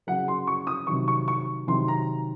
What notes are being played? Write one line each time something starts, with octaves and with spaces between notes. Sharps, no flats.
C#3 F#3 F#5
C6
C#6
D#6
C3 D#3 F#3 C#6
C#6
C#6
C3 D#3 F#3 C6
A#5